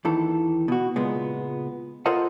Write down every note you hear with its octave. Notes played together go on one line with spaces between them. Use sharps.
D#2 D#3 E3 A4
B2 F#4
C#2 A#2 G#3 B3
F4 A4 A#4 C5 D#5 F#5